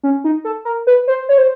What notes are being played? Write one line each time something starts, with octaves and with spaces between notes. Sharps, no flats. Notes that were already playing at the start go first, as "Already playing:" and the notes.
C#4
D#4
A4
A#4
B4
C5
C#5
C5